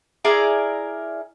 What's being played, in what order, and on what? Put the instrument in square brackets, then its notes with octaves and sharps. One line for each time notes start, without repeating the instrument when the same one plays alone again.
[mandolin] E4 G#4 A#4 D5